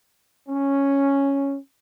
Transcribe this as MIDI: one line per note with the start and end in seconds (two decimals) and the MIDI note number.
0.49 1.57 61